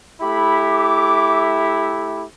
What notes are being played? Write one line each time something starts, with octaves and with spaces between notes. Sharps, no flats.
A3 E4 G4 B5
D6